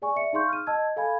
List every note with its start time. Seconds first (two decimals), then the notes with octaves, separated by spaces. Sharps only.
0.02 G#4 D5 G#5 C#6
0.16 D5 E5 C#7
0.33 D#4 G#4 F5 C6 C#6 G6
0.49 F6 D#7
0.67 D#5 A5 E6 G#6
0.96 A4 F5 G#5 B5 G#6